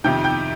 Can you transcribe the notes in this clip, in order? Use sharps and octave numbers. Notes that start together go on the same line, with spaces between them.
F2 C3 D#3 G5 G6
G5 G6